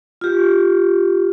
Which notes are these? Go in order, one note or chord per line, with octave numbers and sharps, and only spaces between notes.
F4 G4